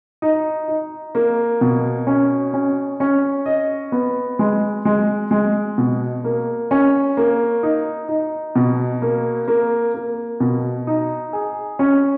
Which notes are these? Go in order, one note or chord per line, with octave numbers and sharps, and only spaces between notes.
D#4
D#4
A#3
B2
C#4
C#4
C#4
D#5
B3
G#3
G#3
G#3
B2
A#3
C#4
A#3
D#4
D#4
B2
A#3
A#3
A#3
B2
D#4
G#4
C#4